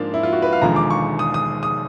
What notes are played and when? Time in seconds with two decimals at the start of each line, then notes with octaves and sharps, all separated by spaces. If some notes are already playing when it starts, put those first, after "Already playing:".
Already playing: G#2 F3 A#3 D4 F4
0.14 E4
0.23 F4
0.33 F#4
0.42 B4
0.53 F5
0.62 E1 D#2 D3 F3 G#3 A#5
0.76 D6
0.90 C#6
1.19 D#6
1.34 D#6
1.63 D#6